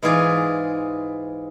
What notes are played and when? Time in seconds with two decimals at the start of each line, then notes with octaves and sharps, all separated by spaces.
0.02 G#2 E3 F4 G#4 D5